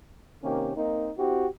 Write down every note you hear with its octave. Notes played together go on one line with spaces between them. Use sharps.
C3 D#3 A#3 C#4 G4
A#3 C4 D#4
C4 E4 F#4 G4